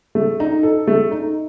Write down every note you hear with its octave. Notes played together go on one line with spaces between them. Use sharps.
A3
D#4
A4
A3
D#4